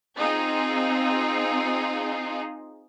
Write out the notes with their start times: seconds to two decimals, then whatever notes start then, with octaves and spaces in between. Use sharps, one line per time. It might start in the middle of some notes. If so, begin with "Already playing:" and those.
0.17 C4 D#4 F4 G#4